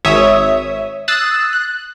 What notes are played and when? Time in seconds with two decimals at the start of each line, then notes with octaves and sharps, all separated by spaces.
0.05 G#1 C#5 E5 D#6
1.08 D#6 E6 F#6 A6 C7 E7
1.53 F#6